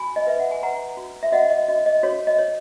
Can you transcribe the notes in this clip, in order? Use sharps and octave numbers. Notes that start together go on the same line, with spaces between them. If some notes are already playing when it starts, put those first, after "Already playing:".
Already playing: F#4 G#5 B5
D#5
B4 E5
F#5
G#5
B4 F#5 A#5
F#4
E5
F#4 D#5 F#5
D#5
F#4 D#5
D#5
F#4 C#5
D#5
C#5